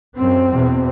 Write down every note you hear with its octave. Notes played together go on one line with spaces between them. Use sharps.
F#2 C4
E2 B2